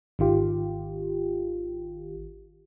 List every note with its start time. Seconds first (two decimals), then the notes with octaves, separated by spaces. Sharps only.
0.19 G#1 D#3 F4 G4